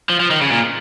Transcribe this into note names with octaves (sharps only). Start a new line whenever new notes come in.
F3
F3
D#3
C#3
A#2